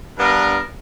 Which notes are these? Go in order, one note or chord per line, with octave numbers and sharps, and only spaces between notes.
G2 B3 D4 A#4